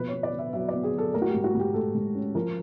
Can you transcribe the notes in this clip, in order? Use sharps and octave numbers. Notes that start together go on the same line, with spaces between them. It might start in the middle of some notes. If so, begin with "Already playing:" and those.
Already playing: B2 F3 B4
B3 C#5
D5
B3
E5
F#3 E5
B3 D5
G#4
F#3 A4
A3 A#4
F#4
G4
G#2
F#4
G#2 G4
A3 A4
G#2
C#4
F3 A#4